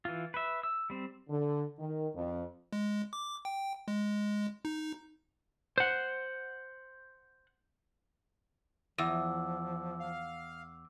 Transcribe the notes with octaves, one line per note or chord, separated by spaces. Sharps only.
E3 F4
B4 E5
E6
G3 C4
D3
D#3
F2
G#3
D6
G5
G#3
D#4
C5 F#5
E2 F3 D6 E6
F5